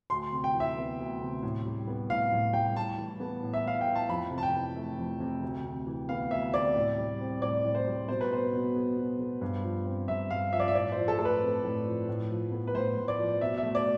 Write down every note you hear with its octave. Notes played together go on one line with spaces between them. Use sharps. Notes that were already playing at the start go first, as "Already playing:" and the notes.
D2 C6
C3
G5
E3
E5
B3
D2
C3
A2
G3
B3
A2 F5
A2
G3 G5
A2 A5
E3
B3
A2
E5
A2 F5
G5
E3
A5
F2 B5
C3
A5
G5
E3
A3
F2
C3
D2
C3
E3
B3 F5
D2 E5
C3 D5
A2
G3
C4
A2 D5
A2
C5
G3
B2 C5
B4
B3 C5
B2
B3
B2
B3
G2
F3
C4
G2 E5
G2 F5
F3 E5
D5
E5
A2 D5
F3 C5
A4
A3 A4
B4
C4
A2
F3
A2
F3
B3
B4
A2 C5
A2
D5
F3
B2 E5
E5
A3
D5